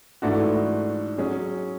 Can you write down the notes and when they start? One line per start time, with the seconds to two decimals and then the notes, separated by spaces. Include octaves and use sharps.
0.22 G#2 E3 A3 D4 F#4
1.18 F#3 C#4 G#4